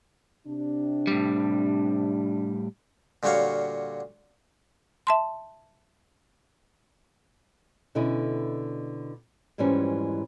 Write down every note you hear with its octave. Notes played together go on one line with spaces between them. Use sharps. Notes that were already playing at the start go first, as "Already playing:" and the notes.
C3 D4
A2 G3
A#2 D3 G3 F#4 C#5 F5
E5 A5 C6
B2 D3 C#4 E4 D#5
F2 G#2 E3 G3 C#4